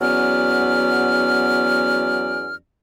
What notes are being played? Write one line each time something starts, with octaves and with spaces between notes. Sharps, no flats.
E2 F#3 B3 C#4 D5 F6